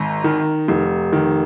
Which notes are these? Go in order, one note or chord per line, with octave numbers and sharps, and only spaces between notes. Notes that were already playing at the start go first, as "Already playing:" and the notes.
Already playing: G#1 A#5
D#3
F1
D#3